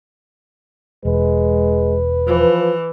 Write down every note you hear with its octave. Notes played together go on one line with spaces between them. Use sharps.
E1 G#3 B4
E3 F3